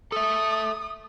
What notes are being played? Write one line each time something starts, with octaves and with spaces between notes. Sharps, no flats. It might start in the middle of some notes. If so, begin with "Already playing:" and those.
A4 E5 D#6